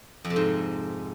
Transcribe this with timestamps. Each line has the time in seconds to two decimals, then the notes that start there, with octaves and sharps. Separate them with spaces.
0.25 F2
0.30 C3
0.36 G#2